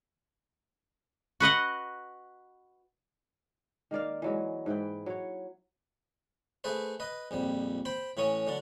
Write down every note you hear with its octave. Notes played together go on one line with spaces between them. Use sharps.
F#4 B4 D#5 F#5
D#3 A#3 D5 F5
E3 F#3 G#3
G#2 E3 E4 G5
F#3 C#5
A3 G#4 B4 C5
B4 D#5
A#1 F2 G3
C5 G5 B5
A2 E3 C#4 C#5 D#6
D3 F#3 D4